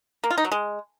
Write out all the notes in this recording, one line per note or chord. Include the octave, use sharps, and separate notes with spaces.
A#3
F4
D#4
F#3
G#3